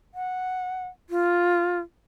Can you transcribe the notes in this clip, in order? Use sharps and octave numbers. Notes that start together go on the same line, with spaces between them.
F#5
F4